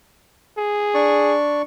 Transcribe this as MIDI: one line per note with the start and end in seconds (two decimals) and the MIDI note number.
0.58 1.37 68
0.94 1.62 62
0.94 1.62 74
0.94 1.62 85